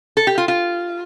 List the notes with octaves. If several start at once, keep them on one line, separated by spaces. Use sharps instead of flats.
A4
G4
F4
F4